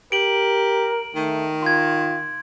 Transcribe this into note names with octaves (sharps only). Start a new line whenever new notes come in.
G4 A#4 D7 F#7
D#3 A3
F4 C6 G#6